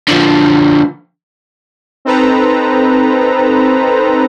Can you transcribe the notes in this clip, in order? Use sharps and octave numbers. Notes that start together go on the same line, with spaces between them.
D3 F3
C4 D#4 A4 B4 C5 A#5